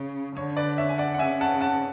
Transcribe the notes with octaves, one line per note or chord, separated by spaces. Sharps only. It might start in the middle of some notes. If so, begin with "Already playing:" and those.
Already playing: C#3
D3 C#5
B4 D5
C#5 E5
G#5
D5 F#5
F#5
C#3 E5 G#5
F#5 A5
F#5 A5